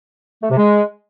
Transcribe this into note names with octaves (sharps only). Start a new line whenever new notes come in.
A3
C3
G#3